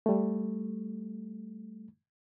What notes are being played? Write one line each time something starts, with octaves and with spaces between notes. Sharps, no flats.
G3 A3